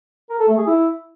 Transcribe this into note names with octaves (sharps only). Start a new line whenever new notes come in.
A#4
A4
A3
G#4
E4